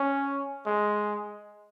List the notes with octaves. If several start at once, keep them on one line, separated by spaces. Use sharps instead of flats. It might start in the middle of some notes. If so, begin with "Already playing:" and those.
Already playing: C#4
G#3